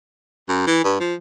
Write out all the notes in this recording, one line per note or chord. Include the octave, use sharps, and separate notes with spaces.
F#2
E3
G2
F3